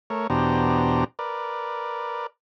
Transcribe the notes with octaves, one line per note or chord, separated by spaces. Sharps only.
A3 A#4 C#5
E2 B2 D4 G4 C5 A#5
A#4 B4 D5